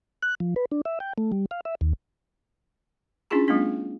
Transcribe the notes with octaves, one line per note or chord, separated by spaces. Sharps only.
F#6
F3
B4
D4
E5
G5
A3
G3
F5
E5
D#2
C#4 D4 E4 F4 G#4 A#5
G3 A3 B3 C#4 D4 F4